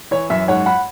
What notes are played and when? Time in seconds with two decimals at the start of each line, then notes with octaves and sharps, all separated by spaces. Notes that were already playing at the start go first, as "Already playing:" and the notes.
0.11 E3 C#5
0.30 F#2 E5
0.48 G#2 C#5 F#5
0.66 F#5 B5